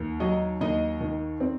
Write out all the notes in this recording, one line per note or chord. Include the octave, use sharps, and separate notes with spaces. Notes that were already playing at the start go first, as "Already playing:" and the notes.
Already playing: D#2
F#3 D#5
D#2 D#5
D#3
C4